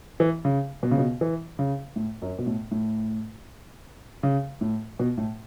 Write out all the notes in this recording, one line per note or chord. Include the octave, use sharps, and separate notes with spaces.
E3
C#3
B2
C#3
B2
E3
C#3
A2
F#2
B2
A2
A2
C#3
A2
B2
A2